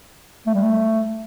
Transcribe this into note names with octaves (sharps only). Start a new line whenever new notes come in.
A3
G3
A3